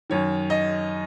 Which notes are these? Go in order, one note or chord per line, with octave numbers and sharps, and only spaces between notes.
F#2 D#3 C#5
D#5